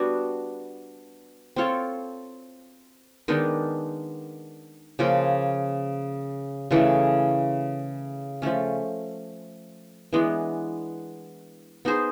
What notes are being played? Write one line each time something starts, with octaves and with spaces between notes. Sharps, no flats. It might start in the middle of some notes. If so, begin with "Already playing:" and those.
Already playing: G3 B3 D4 F#4
C4 F4 A4 C#5
D#3 G#3 B3 D4
C#3 F3 A#3 C#4
C#3 E3 A3
F3 A3 C#4
E3 G#3 B3 D4
B3 D#4 G#4 C5